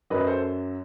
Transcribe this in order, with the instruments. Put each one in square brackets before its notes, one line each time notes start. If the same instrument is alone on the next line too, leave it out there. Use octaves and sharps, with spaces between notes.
[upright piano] F#2 F#3 B4 D#5
A4 C5